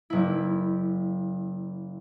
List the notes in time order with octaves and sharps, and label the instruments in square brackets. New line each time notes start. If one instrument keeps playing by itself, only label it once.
[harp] F#1 E4